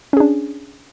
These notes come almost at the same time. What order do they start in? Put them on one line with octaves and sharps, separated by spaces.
C#4 G#4 D4